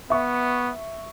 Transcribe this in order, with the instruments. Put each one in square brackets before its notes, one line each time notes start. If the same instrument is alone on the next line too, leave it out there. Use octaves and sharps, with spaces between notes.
[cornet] B3 [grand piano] E5 C#6